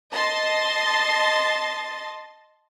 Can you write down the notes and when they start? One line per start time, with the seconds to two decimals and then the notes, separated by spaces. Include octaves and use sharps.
0.12 D#5 A5 C6 A6